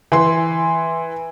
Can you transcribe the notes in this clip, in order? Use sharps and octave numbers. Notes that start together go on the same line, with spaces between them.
E3 C6